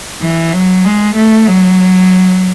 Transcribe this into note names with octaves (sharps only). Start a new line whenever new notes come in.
E3
F#3
G#3
A3
F#3